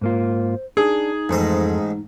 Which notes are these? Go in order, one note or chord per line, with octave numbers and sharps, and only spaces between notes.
G#2 A#3 F4 C5
D4 D#4 G#4
A1 F2 G#2 A4 C5 D#5